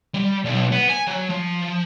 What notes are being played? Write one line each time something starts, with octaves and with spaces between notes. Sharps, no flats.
G3
B1
B3
G#5
F#3
F3